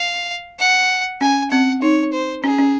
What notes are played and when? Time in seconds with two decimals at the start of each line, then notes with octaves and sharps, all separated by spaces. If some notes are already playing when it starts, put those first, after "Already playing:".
Already playing: F5
0.60 F#5
1.21 C#4 G#5
1.51 C4 F#5
1.82 D#4 C#5
2.12 C5
2.44 C#4 G#4
2.59 C#4